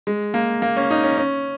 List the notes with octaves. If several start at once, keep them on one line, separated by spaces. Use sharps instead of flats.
G#3
A#3
A#3
C#4
D#4
C#4
C#4